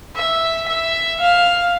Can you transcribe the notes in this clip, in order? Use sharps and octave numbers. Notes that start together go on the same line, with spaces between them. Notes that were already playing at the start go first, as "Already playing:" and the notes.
E5
E5
F5